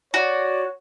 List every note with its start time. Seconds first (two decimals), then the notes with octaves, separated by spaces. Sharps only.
0.14 F#4 C#5 D5